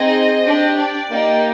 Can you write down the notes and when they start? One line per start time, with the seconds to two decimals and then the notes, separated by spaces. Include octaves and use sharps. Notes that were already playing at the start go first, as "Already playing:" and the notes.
Already playing: C4 D#4 G#4 C5 D#5
0.44 D4 G4
0.77 D5
1.10 A#3 D#4 G4